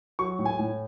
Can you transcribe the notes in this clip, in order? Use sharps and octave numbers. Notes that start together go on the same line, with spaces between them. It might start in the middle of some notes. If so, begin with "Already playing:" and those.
F#3 C#6
A2
G#5
A2